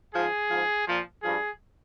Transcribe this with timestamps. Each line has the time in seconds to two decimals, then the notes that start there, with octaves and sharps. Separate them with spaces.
0.12 G#2 F3 G#4
0.49 G#2 F3
0.86 A#2 F3
1.22 G2 F3 G#4